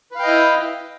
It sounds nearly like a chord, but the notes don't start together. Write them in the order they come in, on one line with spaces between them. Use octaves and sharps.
B4 F5 G5 D#5 E4